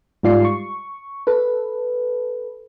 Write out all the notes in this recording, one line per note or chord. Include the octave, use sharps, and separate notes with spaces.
G#2 G3 F4 D5 C7
C#6
A4 B4